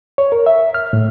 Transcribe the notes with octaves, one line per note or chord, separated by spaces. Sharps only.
C#5
A#4
E5
F6
A2